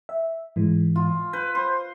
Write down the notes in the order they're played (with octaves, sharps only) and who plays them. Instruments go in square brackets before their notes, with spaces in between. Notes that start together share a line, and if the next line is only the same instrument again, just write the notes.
[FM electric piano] E5
G#2 E3 G#3
[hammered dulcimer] F4
[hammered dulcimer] B4 [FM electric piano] G6
[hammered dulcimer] C5